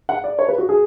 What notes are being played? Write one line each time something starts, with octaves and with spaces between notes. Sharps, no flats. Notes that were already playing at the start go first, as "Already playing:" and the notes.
F#5
D5
C#5
B4
F#4
G#4